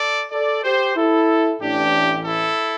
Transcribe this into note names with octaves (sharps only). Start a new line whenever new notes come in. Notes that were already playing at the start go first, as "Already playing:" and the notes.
Already playing: A4 D5
A4 D5
G4 C5
E4 A4
A1 A2 E3 D4 G4
E4 A4